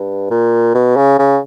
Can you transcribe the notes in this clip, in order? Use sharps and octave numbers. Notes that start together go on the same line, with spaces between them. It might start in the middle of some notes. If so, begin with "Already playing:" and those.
Already playing: G2
A#2
B2
C#3
C#3